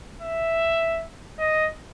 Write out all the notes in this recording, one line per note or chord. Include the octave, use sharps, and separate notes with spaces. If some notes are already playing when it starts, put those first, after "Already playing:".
E5
D#5